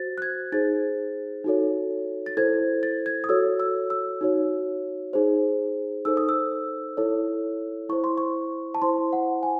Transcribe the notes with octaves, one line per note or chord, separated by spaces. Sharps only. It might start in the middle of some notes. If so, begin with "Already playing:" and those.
Already playing: F#4 C5 A6
F#6
G#6
D#4 G#4 C5 A6
D#4 F#4 A4 C#5
A6
E4 A4 C5 G#6
A6
G#6
D#6
F#4 A4 C#5 E6
E6
E6
D#4 F#4 C#5
D#4 G#4 C5
D#4 A4 C5 E6
D#6
E6
E4 A4 C#5
E4 C5 C#6
C6
C#6
A5
E4 C5 C6
F#5
G#5